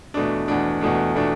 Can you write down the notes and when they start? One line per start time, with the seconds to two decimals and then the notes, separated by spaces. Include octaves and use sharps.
0.14 E2 B2 A3 D4
0.48 E2 B2 A3 D4
0.81 E2 B2 A3 D4
1.15 B2 A3 D4